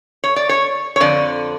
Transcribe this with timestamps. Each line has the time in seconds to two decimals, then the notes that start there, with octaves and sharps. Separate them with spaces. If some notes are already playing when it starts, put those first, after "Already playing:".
0.24 C#5
0.36 D5
0.49 C#5
0.96 C#5
1.00 F2 D3 D5